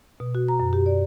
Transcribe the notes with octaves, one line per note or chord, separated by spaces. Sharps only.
B2
F#4
A#5
F#2
G4
D5